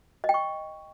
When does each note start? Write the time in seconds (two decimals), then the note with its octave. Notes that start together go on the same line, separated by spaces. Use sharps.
0.24 D#5
0.29 G5
0.34 C#6